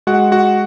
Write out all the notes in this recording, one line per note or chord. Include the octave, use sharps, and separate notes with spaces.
G#3 F#4 F#5
F#4 F#5